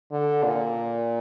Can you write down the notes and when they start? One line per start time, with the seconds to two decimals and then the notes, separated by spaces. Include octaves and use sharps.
0.12 D3
0.43 A#2